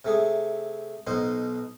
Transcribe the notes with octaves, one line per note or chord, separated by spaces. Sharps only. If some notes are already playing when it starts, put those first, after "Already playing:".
C3 A3 G#4
B1 B2 D#4 C5